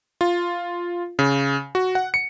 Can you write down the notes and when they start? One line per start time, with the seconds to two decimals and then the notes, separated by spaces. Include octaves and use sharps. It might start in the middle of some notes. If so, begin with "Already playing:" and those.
0.21 F4
1.19 C#3
1.75 F#4
1.95 F#5
2.14 C#7